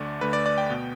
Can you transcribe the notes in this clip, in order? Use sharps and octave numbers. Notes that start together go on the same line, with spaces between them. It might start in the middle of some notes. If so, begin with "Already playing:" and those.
Already playing: D2 D3 A3 D5
D2 D3 A3 B4
D5
D5
G5
B2 B3